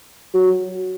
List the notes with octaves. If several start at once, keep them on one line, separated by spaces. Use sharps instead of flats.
F#3